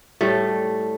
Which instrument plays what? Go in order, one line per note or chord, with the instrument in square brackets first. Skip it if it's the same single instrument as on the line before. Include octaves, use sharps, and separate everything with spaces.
[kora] A2 G3 A3